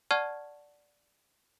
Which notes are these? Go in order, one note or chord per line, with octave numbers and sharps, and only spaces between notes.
D5 F#5 A5 C#6 F6 G#6